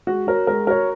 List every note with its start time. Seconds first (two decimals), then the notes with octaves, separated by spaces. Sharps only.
0.07 G#3 F#4
0.27 F#4 A#4 C#5
0.47 G#3 A#4
0.67 F#4 A#4 C#5